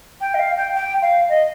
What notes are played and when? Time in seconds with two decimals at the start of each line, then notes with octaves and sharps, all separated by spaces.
0.20 G5
0.34 D#5
0.39 F5
0.57 G5
0.75 G5
1.02 F5
1.28 D#5